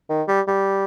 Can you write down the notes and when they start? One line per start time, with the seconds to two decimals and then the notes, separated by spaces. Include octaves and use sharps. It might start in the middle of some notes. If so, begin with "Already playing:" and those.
0.10 D#3
0.28 G3
0.48 G3